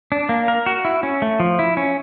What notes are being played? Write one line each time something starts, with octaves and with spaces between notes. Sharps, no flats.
D4
A#3
A#4
F#4
E4
C#4
A3
F3
E4
C#4